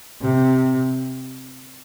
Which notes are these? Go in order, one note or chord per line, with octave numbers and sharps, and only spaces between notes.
C3